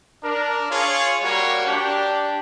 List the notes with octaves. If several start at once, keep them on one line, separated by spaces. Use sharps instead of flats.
D4 A#4
F4 G#4 C#5
G3 A#3 F#4 C#5
D4 G4